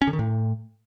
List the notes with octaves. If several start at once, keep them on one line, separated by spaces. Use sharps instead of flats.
C#4
D3
D#3
A2